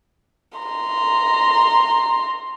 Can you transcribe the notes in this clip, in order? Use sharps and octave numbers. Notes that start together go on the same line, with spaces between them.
A#5 C6